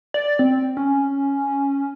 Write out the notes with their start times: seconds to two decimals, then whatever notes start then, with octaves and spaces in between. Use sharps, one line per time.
0.14 D5
0.39 C4
0.77 C#4